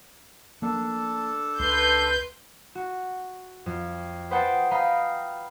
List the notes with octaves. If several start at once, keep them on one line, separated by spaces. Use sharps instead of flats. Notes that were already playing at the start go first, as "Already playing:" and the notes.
F3 A3 A#3 D4 A4
C#2 B4 C6 G6
F#4
F2
B4 C5 D#5 F#5 G5 A5
B4 D#5 F5 G5 A#5 B5